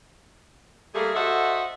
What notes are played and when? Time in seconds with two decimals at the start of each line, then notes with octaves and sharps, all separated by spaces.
0.95 G3 A3 A#3 G#4
1.15 F#4 A4 C5 D#5 E5 F#5